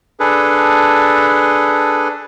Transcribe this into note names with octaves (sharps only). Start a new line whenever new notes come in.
D4 G#4 A4 B4